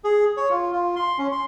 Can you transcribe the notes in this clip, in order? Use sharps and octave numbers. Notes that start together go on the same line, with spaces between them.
G#4
C#5
F4
F4
C6
C#4
C6